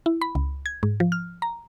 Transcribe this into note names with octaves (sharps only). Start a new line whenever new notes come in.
E4
B5
C#2
G#6
G#2
F3
F6
A#5